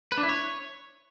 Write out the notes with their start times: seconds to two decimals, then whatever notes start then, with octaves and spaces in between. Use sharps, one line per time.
0.12 B4
0.18 D4
0.23 E4
0.29 C#5